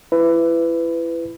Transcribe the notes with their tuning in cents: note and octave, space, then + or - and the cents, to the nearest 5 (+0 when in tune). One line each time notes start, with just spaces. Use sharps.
E4 +25 B4 +20